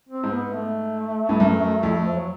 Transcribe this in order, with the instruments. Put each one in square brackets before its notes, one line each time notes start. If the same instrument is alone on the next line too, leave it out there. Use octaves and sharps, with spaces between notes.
[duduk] C4
[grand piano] G#2
[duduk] B3
A3
[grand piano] G2
F#2
F2
[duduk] F3
F#3